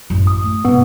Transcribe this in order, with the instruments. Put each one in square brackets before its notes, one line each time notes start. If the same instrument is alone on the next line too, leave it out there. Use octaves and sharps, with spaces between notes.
[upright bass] A1 F#2
[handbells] D#6
[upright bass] A3
[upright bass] G#2 C3 [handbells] B3